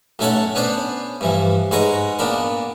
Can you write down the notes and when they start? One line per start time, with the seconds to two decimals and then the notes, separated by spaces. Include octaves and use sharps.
0.19 B1 A3 C#4 A4 C#5 F#5
0.55 B3 C#4 D4 C5
1.21 G2 E3 F3
1.71 G#2 G#3 B4 C#5 A#5 C#6
2.19 A#2 B3 D4 A#4